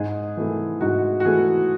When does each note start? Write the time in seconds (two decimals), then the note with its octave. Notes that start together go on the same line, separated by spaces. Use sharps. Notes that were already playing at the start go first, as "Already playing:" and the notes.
Already playing: G#2 G#4
0.37 E3 A3
0.81 G#2 F#4
1.20 F#4
1.25 E3 A3 G#4